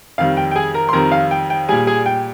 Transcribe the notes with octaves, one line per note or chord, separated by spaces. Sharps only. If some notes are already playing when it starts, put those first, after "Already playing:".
F2 D#3 G3 F5
G5
G5
G#4 G#5
A#4 A#5
C6
F2 D#3 G3 A#4 A#5
F5
G5
G5
A#2 G3 G#4 G#5
G#4 G#5
G5